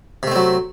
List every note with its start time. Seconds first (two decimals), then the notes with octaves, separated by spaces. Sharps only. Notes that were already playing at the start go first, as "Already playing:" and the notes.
0.23 C3
0.27 A3
0.31 C4
0.36 F#3